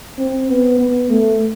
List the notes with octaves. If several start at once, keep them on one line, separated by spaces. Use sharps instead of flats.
C4
B3
B3
A3